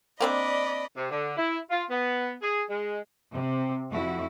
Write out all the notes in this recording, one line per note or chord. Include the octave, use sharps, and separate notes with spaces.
A#3 C4 D4 D5 D#5 B5
C3
D3
E4
F4
B3
G#4
G#3
C3
F2 E4 F#4